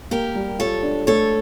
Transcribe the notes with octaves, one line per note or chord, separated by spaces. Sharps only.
A#3 G4 A#4
G3
F4 A4 C#5
D4
A3 A4 C#5